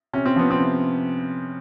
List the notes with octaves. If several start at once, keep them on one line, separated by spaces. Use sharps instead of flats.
C3 C#4
C4
F3 B3
C4
C3